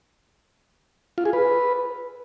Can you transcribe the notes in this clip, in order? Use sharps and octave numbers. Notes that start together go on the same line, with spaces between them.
F4
G#4
B4